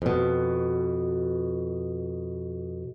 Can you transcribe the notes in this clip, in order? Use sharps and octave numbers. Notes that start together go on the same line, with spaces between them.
F2 B2